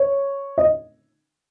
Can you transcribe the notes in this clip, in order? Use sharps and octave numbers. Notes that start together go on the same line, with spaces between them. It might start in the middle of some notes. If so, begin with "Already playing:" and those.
Already playing: C#5
D#5